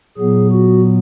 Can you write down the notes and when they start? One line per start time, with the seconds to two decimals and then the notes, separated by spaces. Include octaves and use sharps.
0.18 A#2 F#3 B3 G#4
0.51 F#4